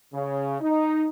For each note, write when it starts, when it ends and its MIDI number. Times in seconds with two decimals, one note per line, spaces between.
0.14 0.56 49
0.61 1.08 63